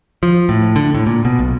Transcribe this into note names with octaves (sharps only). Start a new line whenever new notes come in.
F3
A2
D3
A2
A#2
B2
B1